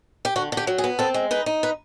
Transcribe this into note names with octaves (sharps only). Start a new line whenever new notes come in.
G4
D3 F#4
D3
G4
F#3
G#4
B3
C4 A4
G#3
D#4 B4
D#4
B4